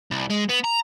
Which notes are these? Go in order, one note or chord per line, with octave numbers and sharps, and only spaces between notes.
C2
G#3
B3
A#5